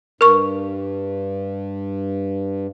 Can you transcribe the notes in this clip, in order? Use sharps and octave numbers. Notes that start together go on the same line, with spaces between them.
G2 A#4 C#6